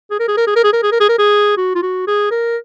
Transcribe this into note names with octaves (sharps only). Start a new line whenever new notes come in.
G#4
A#4
G#4
A#4
G#4
A#4
G#4
A#4
G#4
A#4
G#4
A#4
G#4
F#4
F4
F#4
G#4
A#4